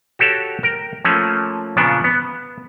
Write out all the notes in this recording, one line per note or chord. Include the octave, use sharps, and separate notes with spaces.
F#4 G4 A4 C#5
A#4 G5
F3 A3 A#3 C#4
A#2 C#3 F3 B3 D4
B3